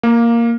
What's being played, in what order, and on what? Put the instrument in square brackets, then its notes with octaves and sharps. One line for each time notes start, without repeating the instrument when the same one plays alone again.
[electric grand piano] A#3